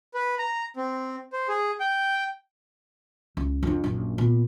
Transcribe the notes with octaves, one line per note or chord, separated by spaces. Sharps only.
B4
A#5
C4
C5
G#4
G5
C#2
F2 D4
A#1 F#2
A#2 B3